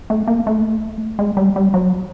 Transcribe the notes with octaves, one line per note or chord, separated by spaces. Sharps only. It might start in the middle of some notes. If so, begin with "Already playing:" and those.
A3
A#3
A3
G#3
G3
G3
F#3